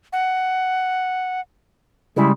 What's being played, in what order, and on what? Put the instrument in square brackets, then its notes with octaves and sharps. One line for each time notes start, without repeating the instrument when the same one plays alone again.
[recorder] F#5
[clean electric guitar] C#3 G3 G#3 [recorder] E4